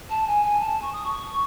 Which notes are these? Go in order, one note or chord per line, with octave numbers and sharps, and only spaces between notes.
A5
G#5
G#5
A5
C#6
D#6
C#6